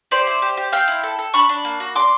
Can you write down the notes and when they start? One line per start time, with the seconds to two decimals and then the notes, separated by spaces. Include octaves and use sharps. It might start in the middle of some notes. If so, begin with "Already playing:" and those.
0.11 G4 C5 D5
0.27 E4
0.42 G4
0.57 G4
0.72 C4 F5 G5
0.88 E4
1.03 A4
1.19 A4
1.34 D4 B5 C#6
1.49 D4
1.65 A#3
1.80 F#4
1.96 D4 C6 D6